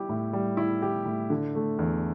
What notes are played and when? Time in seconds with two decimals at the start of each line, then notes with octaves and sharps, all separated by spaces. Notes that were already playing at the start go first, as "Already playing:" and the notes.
Already playing: G3 E4 G4
0.09 A2
0.33 G3
0.57 E4
0.82 G4
1.05 A2
1.30 D3
1.55 A3
1.79 E2